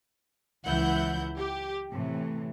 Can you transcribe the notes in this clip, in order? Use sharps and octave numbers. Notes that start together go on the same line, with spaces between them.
C#2 E3 F#3 E4 F#5 G6
G4
A2 C3 E3